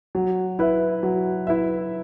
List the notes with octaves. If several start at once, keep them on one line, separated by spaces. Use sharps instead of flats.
F#3
E4 B4 E5
F#3
E4 B4 E5